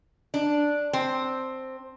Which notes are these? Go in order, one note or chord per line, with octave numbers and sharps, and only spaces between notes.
D4
C4